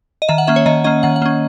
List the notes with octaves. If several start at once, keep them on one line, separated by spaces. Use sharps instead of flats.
D#5
D#3 E5
F#5
A#3 C#4 E5
C#5
D#3 D#5
A#3 C#4 D#5
D#3 F#5
F#5
A#3 C#4